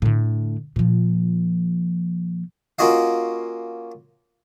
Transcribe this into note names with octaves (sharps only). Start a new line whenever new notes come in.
A2 D3
A#2 F3
A#3 C#4 F4 F#4 D#5 F5